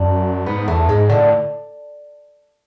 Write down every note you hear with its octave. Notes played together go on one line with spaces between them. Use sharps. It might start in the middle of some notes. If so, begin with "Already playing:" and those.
Already playing: F#2 D4
G#2 B3
E2 A3
G#2 G#3
A2 D3